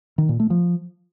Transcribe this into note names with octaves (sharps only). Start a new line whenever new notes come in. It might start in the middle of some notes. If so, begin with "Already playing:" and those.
D#3
A#2
A3
F3